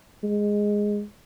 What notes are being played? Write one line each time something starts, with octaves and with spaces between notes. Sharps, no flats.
G#3